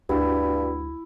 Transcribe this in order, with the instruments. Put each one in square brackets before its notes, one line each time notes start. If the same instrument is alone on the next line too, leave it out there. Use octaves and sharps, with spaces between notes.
[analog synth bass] D2 [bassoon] G2 [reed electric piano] D4 F#4 G4 [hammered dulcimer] E4